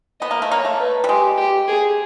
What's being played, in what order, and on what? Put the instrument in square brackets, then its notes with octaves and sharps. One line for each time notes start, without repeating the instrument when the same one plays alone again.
[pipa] B3 [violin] D#5
[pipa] A#3
A3
[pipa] A#3 [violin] C#5
[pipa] A3
[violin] B4
[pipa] G3
[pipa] G#3 [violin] G4
[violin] G4
G#4